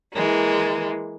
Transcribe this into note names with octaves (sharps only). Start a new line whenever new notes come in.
E3 G#3 A#3